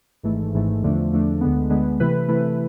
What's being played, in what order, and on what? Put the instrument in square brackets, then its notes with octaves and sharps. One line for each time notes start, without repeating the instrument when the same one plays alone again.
[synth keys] G#1 G#2 E3 A3
G#1 G#2 E3 A3
E2 D3 F3 A3 D4
E2 D3 F3 A3 D4
D2 D3 G#3 B3
D2 D3 G#3 B3
C3 E3 A3 E4 B4
C3 E3 A3 E4 B4